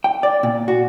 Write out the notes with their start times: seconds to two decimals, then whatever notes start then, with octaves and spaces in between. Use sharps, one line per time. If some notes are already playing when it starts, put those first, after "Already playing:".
0.04 G5
0.23 D5
0.43 A#2
0.68 F#4